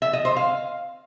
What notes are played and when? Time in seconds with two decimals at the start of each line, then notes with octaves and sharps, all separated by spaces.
0.02 E5
0.13 D#5
0.25 C5
0.36 F5